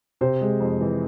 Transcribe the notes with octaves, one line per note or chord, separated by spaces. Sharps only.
C3 C5
G#3
F2
E3